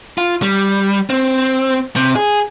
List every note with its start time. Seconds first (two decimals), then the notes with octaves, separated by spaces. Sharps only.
0.18 F4
0.43 G3
1.10 C4
1.96 C3
2.16 G#4